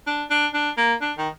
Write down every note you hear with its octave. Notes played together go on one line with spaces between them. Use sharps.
D4
D4
D4
A#3
D4
D#3